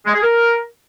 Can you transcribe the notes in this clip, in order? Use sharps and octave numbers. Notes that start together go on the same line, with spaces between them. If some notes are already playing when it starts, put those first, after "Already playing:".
G#3
G#4
A#4